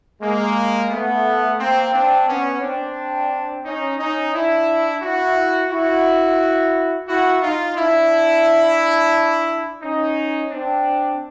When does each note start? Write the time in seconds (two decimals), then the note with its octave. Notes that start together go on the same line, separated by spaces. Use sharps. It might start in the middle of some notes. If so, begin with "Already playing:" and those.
0.22 G#3 A#3
0.91 A3 B3
1.59 A#3 C4
1.93 C4 D4
2.28 B3 C#4
2.62 C4 D4
3.65 C#4 D#4
3.99 C#4 D#4
4.33 D4 E4
5.02 E4 F#4
5.70 E4 F#4
7.08 E4 F#4
7.42 D#4 F4
7.76 D4 E4
9.82 C#4 D#4
10.51 C4 D4